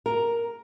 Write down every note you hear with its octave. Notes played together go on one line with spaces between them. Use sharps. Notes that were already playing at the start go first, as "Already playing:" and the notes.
A#4